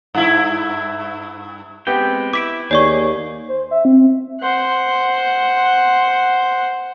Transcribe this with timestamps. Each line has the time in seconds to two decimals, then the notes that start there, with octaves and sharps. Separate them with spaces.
0.14 G2 E4
1.87 G#3 B3 C4 G4 B4 G5
2.33 E4 D6 B6 D7
2.71 D#2 G#4 C#5 D5 C#6
3.49 C5
3.71 E5
3.85 C4
4.41 C5 F#5